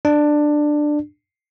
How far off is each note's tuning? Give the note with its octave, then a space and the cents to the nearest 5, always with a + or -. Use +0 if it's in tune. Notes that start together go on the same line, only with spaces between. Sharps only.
D4 +15